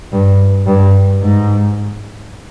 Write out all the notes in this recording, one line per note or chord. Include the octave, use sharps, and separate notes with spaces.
G2
G2
G#2